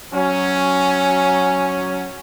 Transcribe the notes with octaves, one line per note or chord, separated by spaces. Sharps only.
F#3 C#4